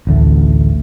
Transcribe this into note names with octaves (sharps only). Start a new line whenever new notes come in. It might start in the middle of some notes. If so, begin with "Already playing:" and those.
A1 D2 A3